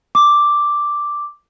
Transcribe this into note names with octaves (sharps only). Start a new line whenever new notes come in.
D6